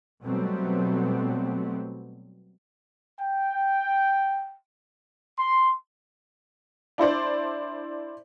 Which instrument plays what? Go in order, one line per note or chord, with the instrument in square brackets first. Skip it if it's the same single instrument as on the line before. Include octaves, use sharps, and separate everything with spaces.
[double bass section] B2 F#3 G3 A3 B3 C4
[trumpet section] G5
C6
[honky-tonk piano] D4 E4 C5 D5